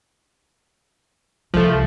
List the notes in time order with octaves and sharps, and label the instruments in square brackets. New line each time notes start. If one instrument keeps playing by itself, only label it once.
[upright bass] C2 E4 [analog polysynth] F3 A3